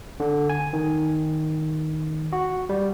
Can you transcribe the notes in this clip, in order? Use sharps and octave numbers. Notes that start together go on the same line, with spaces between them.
D3
G#5
D#3
F#4
G3